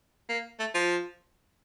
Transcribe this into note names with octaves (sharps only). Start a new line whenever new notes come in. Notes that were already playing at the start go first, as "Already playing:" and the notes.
A#3
A3
F3